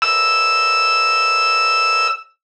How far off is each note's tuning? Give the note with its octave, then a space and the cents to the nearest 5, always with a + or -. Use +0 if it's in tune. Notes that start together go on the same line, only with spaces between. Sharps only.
E6 +0